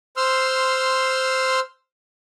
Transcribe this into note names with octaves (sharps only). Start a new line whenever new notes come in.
C5 C6 E6 F6